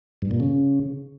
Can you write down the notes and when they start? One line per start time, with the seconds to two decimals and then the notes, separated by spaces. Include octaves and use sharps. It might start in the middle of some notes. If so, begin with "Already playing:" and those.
0.22 G2
0.31 A#2
0.40 C#3